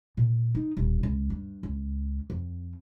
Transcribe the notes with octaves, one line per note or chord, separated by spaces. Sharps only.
A#2
D#4
D#1
C#2
G2
C#2
F2